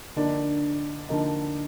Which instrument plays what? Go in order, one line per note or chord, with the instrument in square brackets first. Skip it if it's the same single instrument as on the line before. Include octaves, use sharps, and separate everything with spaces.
[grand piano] D3 F3 A#3 D#4 [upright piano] D4
[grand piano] D3 F3 A#3 D#4